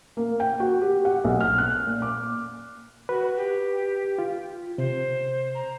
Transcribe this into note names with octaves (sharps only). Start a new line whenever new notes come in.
A#3
G5
F#4
G4
F#5
B1
F6
F#6
A#2
D6
F#4 B4
G4
F4
C3 C5
A#5